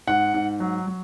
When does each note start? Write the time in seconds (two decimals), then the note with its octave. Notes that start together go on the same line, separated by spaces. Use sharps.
0.07 G#2 F#5
0.34 G#2
0.60 F#3
0.87 F#3